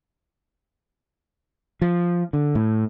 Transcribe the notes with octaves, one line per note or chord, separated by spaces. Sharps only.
F3
D3
A2